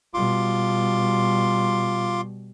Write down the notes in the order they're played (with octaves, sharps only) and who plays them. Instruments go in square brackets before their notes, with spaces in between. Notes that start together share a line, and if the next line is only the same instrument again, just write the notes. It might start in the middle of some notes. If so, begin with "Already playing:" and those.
[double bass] B2 G3 [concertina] F4 C6 D6